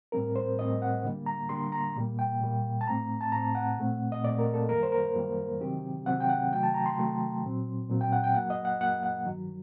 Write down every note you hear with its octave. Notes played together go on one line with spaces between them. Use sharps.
A2 G3 C4 A#4
C5
A2 G3 C4 D#5
F#5
D3 G3 A#3
A#5
D3 G3 A#3 C6
A#5
A#2 G3 A#3
G5
A#2 G3 A#3
A5
A2 A3 C4 A#5
A5
A2 A3 C4 A#5
F#5
A#2 A3 C4
D#5
A#2 A3 C4 D5
A#4
A4
F#2 D#3 G3 A#3 A#4
C5
A#4
F#2 D#3 G3 A#3
C3 D#3 F#3 C4 G4
C3 D#3 F#3 C4 F#5
G5
F#5
C3 D#3 F#3 A3 G5
A5
A#5
C6
C3 D#3 F#3 A3
A#2 F#3 C4
A#2 F#3 C4
G5
F#5
G5
F#2 F#3 A#3 F#5
D#5
F#5
F#2 F#3 A#3 F#5
F#5
G2 D#3 F#3